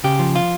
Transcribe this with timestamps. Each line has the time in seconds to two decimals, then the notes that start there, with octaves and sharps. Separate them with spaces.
0.04 C#3 G4
0.19 F3
0.36 F4